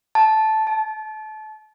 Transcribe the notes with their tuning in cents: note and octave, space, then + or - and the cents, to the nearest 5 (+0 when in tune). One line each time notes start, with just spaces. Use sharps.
A5 -10
A5 -30